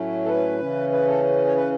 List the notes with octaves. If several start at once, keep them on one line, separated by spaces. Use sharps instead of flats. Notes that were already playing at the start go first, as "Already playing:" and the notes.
Already playing: A2 F#3 A3 C#4
A4
B4
C#3 E3 C#4
B4
A4
C#5
B4